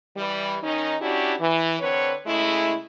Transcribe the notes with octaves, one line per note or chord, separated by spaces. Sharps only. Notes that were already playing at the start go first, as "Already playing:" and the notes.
E3 G3
D#3 C#4 D#4
C#4 D4 E4 F#4 G4
E3
D3 C4 B4 C#5
C#3 G#3 A3 E4